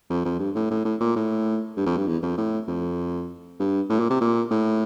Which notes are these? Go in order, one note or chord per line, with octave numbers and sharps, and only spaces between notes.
F2
F2
G2
A2
A2
A2
A#2
A2
G2
F2
G2
E2
F2
A2
F2
G2
A2
A#2
C3
A#2
A2